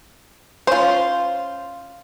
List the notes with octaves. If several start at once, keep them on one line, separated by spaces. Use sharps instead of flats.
C#4 F4 C5